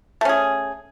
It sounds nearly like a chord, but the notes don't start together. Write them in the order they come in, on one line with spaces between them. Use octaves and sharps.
A3 C#4 G#4